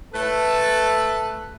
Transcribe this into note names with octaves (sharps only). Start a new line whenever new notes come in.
A3 A4 B4